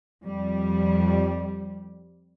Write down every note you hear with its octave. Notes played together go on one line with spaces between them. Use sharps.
F2 G3